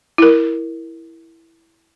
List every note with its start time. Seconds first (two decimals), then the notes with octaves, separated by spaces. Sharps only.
0.18 E4 A#4